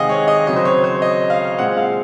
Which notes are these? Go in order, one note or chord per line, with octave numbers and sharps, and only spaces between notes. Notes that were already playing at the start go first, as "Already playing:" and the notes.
Already playing: C3 D#3 G#3 C4 D#5 F5 F#5 G#5
C#5
D#5
C#3 F#3 C4 D#5
C5
C#5
C5
D#5
F5
A#2 G#3 C4 F#5
F5